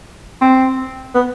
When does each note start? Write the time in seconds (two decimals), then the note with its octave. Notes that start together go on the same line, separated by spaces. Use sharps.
0.41 C4
1.14 B3